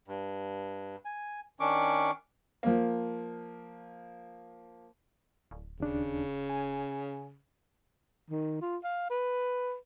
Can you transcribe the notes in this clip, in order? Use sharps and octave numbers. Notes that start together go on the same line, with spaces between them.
G2
G#5
D#3 C#4 D4 C#6 D6
F3 A#3
D1
D#2 C#3 D4
G#5
D#3
F4
F5
B4